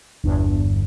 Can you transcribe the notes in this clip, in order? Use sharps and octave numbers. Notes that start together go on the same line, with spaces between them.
G1 E2 G2